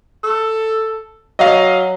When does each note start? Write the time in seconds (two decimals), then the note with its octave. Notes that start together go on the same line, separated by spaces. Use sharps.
0.24 A4
1.39 F#3 D#5 F5